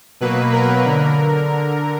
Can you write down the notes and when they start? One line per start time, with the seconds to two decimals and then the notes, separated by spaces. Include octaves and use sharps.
0.21 B2 F#3 A#3 B4
0.53 A#4
0.86 D3